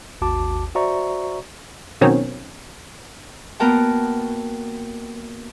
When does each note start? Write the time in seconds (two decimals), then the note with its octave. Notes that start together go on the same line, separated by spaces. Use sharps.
0.21 G#1 D#2 F#4 A5 D6
0.75 F#4 C5 D5 E5 A#5 C#6
2.01 B2 D#3 F#3 C4 C#4
3.60 A#3 B3 F#4 A#4 G5 A5